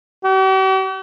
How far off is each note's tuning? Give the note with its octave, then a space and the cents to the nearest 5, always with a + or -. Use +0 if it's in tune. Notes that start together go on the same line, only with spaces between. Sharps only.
G4 -45